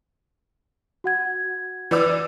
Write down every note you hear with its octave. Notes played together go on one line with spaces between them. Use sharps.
F#4 F#5 G#6
E3 D5 E6